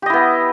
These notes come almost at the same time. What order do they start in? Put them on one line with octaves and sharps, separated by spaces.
G4 D#5 E4 B3